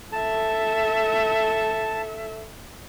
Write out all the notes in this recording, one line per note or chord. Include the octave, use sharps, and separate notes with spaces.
A4 E5 A5